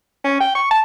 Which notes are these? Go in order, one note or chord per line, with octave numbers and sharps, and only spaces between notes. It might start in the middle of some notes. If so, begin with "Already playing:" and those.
C#4
G5
C#6
A5